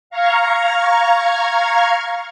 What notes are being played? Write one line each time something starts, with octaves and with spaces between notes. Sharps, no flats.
F5 A#5 C#6 F6 G#6